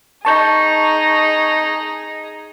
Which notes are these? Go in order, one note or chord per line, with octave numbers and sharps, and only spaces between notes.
D#4 G#4 A5 C#6 G6